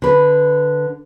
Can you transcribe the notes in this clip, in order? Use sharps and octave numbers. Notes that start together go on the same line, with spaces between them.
D3 B4